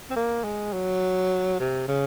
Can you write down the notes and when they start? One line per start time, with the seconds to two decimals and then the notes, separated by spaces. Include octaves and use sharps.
0.11 C4
0.16 A#3
0.44 G#3
0.73 F#3
1.60 C3
1.88 C#3